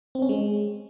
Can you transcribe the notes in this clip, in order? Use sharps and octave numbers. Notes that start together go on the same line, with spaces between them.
C4
C#4
G#3